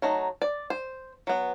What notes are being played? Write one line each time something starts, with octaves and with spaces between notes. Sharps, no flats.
F#3 A3 D#4
D5
C5
F#3 B3